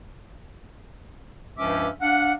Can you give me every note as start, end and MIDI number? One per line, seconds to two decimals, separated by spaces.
1.58 1.88 37
1.58 1.88 43
1.58 1.88 53
1.58 1.88 61
1.58 1.88 76
1.58 1.88 86
2.01 2.33 62
2.01 2.33 77
2.01 2.33 78